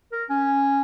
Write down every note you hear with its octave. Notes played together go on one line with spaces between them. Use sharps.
A#4
C#4